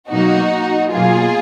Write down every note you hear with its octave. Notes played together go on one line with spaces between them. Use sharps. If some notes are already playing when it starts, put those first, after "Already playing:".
B2 F#3 A#3 D#4 F#4
B2 F#3 A#3 F4 G#4